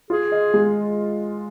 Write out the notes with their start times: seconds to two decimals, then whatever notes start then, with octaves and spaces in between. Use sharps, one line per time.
0.10 F4 G#4
0.32 D#5
0.54 G#3